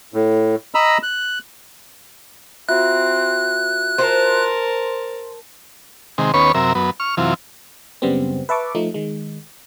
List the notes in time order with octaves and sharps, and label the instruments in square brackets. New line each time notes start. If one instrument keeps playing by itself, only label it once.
[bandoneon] A2
D#5 A#5 B5 E6
F#6
[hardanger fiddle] C4 [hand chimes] F4 F#4 E5 [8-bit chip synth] F#6
[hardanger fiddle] A#4 A5 [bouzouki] C5
[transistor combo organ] C3 D#3 G#3
D#2 B3 C#4 B4 C#5 C#6
F#2 C3 A#4 E5
F#2 B3
C#6 F6
F#2 C3 E3 F4
[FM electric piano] F#2 C#3 G3 B3 C4
B4 E5 A5 C#6 D6
F3 A3 D#4
D#3 G#3